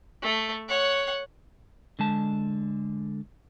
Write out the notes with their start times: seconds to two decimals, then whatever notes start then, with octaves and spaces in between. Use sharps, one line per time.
0.22 A3
0.68 C#5 F#5
1.99 D3 G#3 A5